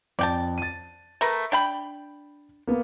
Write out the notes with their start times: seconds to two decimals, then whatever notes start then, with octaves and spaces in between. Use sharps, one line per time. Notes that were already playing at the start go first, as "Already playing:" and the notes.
0.19 F2 D5 G5 A5
0.58 A6 D#7
1.21 A3 A#4 B4
1.52 D4 G5 B5
2.67 A#3 B3